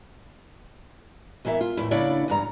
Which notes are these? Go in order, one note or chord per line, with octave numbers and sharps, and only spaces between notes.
E2 E3 A#3 C5 E5
F4
E2 A2 E4
C#3 A#3 D4 E4 C#5 D5
E2 G2 A#5